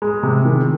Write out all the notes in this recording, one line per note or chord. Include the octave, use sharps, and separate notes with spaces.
G#3
C3
D#3